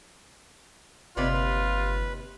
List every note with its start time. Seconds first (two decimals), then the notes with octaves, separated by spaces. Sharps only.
1.17 G1 D#2 C3 F4 B4 D5 E5 B5
1.33 B4